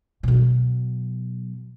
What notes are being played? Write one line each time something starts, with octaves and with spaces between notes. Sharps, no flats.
B2 F#3